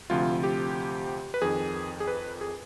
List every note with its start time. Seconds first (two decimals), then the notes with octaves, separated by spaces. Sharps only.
0.10 D2 C3 F3 F4
0.43 G4
1.34 B4
1.42 F2 D#3 G#4
2.00 G#4
2.07 B4
2.41 G#4